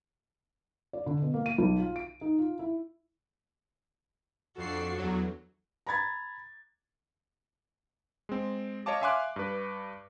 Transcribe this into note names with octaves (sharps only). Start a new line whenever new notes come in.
D5
D3
B2
A#3
D#7
B1
F4
D7
D#4
F4
E4
F2 D4 F#4 A4 C7
E2 F#3
A#5 B5 G#6 A6
G#3 C4
C#5 D#5 F5 A5 D6
E5 F5 G#5 C6 D6 F#6
G2 B4